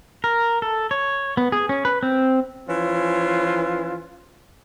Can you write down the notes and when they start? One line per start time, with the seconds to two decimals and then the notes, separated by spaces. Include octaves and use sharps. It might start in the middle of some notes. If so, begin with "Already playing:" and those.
0.24 A#4
0.62 A4
0.91 C#5
1.37 B3
1.52 G#4
1.69 C#4
1.85 B4
2.03 C4
2.69 E3 F3 C#4 F4